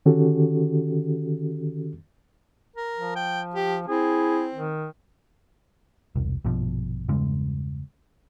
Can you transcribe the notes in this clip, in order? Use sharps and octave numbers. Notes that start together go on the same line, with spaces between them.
D3 D#3 C#4 F#4 G4 A4
A#4
F3
G5
G4
C4 E4 G#4
D#3
E1 C2
A#1 G2 B2 F3
E2 G2 C#3 G#3